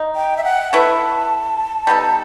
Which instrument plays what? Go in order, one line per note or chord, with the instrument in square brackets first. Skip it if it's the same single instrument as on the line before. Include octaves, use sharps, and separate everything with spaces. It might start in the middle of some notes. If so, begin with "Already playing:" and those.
Already playing: [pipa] D#4
[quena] G5
E5
F#5
[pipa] A3 E4 B4 E5 [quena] A5
[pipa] G3 B3 D#4 A4